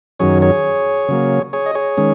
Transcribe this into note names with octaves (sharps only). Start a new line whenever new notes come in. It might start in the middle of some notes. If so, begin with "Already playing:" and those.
F#2 D#3 F#3 C#4 G#4 C#5
G#4 C#5
C#3 F#3 A#3
G#4 C#5
D#5
G#4 C#5
D#3 G#3 C#4